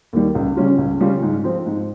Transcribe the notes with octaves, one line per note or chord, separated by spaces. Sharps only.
D#2 D#3 G3
C#2
C#3 G3 C#4 F4
C#2
C#3 G3 C#4 F4
G#2
F3 C4
G#2